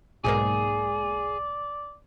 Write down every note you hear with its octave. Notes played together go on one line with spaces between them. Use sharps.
B1 G#2 A#3 G#4 D5